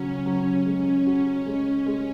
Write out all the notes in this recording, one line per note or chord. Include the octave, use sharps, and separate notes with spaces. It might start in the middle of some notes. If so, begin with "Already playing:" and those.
Already playing: C#3 F#3 C#4
F#3
G#3 C#4
F#4
G#3
G#3